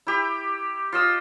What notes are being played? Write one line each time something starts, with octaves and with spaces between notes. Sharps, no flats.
E4 G4
F4 D#5 E6